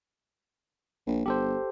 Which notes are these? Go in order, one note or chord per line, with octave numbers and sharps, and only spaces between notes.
A#1
G1 G4 A4 C5